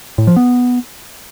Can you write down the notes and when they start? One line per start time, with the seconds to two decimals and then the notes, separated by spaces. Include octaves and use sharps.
0.18 A2
0.27 F3
0.36 B3